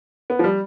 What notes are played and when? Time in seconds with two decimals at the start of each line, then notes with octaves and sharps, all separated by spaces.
0.30 B3
0.39 F3
0.44 G3